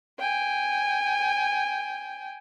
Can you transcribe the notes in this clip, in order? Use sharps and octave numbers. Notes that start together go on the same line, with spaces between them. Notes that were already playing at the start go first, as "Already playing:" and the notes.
G5 G#5